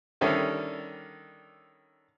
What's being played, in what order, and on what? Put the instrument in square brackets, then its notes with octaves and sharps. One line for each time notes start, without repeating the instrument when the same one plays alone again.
[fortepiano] D3 D#3 G3 C#4 E4 A4